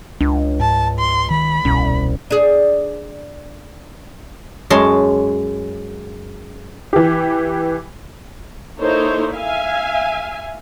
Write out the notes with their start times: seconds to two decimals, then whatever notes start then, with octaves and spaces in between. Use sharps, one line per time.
0.21 C#2 D4
0.60 G#2 A5
0.99 C6
1.30 D#3 B5
1.65 D#1 C2 B2 C#4
2.30 D4 G#4
4.70 F#2 G#3 C#5 A5 C6
6.93 E3 G4
8.80 A#3 D#4 E4 A4 C5 C#5
9.34 E5 F5 G#5